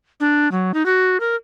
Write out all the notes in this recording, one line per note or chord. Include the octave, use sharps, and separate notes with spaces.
D4
F#3
D#4
F#4
A#4